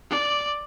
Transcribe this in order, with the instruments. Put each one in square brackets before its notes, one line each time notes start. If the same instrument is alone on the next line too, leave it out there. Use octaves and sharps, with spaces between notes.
[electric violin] D5